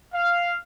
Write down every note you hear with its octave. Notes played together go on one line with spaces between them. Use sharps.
F5